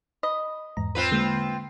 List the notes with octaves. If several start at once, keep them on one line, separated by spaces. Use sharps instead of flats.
D#5 B5
E2 G#2 A#5
C4 F4 B4
D3 G#3 A#3